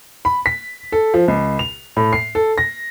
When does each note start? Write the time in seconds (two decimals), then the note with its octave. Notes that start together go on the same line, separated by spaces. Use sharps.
0.25 B5
0.46 B6
0.92 A4
1.14 F3
1.28 C#2
1.59 F7
1.97 A2
2.13 C7
2.35 A4
2.58 A#6